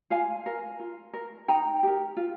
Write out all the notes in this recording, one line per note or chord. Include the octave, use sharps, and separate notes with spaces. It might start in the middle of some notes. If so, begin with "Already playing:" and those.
F4 F5 G#5
A#4
F4
A#4
D#4 G5 A#5
G4 A#4
F4